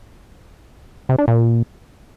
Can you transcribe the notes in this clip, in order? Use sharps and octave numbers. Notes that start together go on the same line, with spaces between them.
C3
D4
A#2